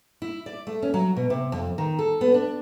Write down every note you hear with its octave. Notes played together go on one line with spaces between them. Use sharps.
E4
D5
A3
C#4
F#3
B2
C3
F2
D#3
A4
B3
D4